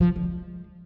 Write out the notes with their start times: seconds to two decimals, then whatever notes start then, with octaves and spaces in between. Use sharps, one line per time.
0.01 F3
0.08 D#3
0.16 D3
0.23 G#3